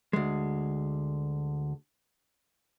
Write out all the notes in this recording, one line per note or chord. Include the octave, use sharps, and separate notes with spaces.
D2 G#3